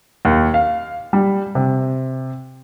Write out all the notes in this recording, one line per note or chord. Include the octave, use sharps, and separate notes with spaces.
D#2
F5
G3
C3